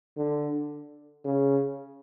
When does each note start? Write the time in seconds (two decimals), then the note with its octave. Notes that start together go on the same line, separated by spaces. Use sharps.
0.17 D3
1.24 C#3